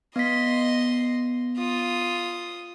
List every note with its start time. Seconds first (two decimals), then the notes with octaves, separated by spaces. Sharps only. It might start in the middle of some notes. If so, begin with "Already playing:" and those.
0.16 B3 D#5 C6 B6
1.58 F4 D#6